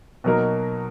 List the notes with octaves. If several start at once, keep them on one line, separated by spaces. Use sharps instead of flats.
B2 F#3 A#3 D#4 A#4